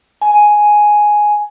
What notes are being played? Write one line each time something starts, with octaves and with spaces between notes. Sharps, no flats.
G#5